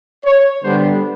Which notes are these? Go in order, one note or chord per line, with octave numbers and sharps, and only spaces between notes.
C#5
D3 G3 B3 D4 C5